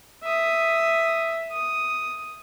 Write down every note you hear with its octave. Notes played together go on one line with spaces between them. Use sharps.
E5 D#6
D#6